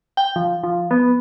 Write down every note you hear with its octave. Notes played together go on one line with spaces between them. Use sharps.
G5
F3
F3
B3